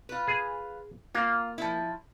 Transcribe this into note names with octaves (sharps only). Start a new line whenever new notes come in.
F4 B4
G#4
A#3 F4
F3 E4